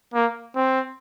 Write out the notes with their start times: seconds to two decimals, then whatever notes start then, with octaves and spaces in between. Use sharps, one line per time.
0.14 A#3
0.55 C4